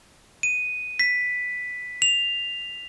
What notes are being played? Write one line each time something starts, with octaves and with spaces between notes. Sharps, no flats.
D#7
B6
F7